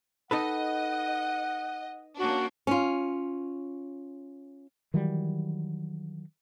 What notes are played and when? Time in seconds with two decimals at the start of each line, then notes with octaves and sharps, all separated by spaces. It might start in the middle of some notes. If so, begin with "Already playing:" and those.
0.31 D#4 A4 B4 D#5 F#5
2.18 A#3 C#4 D4 F#4
2.67 C#4 F4
4.94 D#3 E3 F#3 G3